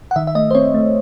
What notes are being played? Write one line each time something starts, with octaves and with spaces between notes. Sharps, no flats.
F#5
D#3 E5
E5
A3 D#5
C5
C4 C#5
A3